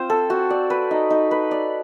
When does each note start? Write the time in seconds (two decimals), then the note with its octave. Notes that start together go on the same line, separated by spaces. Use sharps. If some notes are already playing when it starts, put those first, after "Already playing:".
Already playing: C4 F4 C5
0.10 A4
0.30 F#4
0.50 D5
0.70 B4
0.91 D#4
1.10 D#4
1.31 B4
1.51 D5